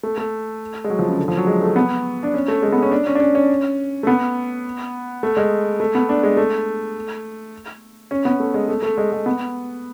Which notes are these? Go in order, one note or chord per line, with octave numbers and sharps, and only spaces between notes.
A3
A3
G#3
F#3
F3
C#3
D3
F3
F#3
G#3
A3
B3
D4
C#4
A3
G#3
A3
B3
C#4
D4
C#4
D4
C#4
C#4
A3
B3
A3
G#3
A3
B3
D4
G#3
A3
C#4
B3
A3
G#3
A3
A3
G#3
G#3
B3